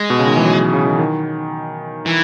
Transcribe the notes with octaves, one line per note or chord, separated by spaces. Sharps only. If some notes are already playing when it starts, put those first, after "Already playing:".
Already playing: G#3
B2
C#3
D#3
E3
F#3
C#3
D#3
D#3
E3